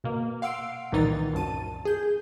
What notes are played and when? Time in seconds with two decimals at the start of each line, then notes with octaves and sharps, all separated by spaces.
0.04 B2 A#3
0.42 F5 F#5 C6 E6 C7 D7
0.92 C2 A#2 D#3 E3 D#4 A6
1.34 C2 F#2 A5 D#7
1.85 G#4 G6